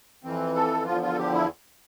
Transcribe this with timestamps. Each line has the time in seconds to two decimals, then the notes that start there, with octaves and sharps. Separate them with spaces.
0.23 F2 E3 C4
0.55 A4
0.86 E2 D3 F3 F4
1.03 F4
1.12 A4
1.19 G4
1.33 E4